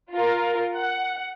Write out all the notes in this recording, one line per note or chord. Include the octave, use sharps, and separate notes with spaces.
F4 A#4
F#5